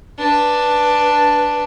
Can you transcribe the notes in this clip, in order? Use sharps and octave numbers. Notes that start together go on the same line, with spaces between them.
D4 B4